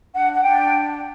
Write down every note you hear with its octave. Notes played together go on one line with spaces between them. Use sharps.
D4 F#5
F#5
D4 G5